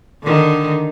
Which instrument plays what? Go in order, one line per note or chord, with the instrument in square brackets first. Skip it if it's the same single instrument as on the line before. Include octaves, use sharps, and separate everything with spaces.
[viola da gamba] D3 D#3